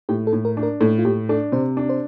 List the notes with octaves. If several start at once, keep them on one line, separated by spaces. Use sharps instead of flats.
A2 G4
A4
A2
A#4
D4
A#4
A2 A4
F4
A2 G4
D4 A4
C3 C5
D4
C5